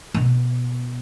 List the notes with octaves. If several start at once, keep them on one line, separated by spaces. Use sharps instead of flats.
B2